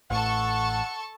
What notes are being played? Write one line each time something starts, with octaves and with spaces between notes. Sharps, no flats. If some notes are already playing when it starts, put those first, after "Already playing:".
A1 A2 A4 F#5 A5 C#6